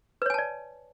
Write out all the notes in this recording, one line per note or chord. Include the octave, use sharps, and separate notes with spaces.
B4 C#5 D5 G#5 A5